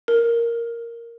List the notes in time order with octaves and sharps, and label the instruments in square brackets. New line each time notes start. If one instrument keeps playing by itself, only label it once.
[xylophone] A#4